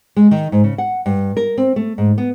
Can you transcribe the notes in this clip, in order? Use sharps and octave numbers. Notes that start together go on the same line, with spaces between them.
G#3
D#3
G#2
C#3
F#5
G2
A#4
C4
A3
G#2
B3